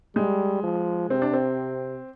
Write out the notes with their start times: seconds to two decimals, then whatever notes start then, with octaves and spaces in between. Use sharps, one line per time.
0.16 G3 G#3
0.63 F3
1.10 C3 C4
1.22 D4
1.33 C4